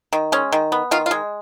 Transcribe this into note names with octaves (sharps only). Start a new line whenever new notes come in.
D#3
G#3 C#4
D#3
B3
D#3 F4
F4
G#3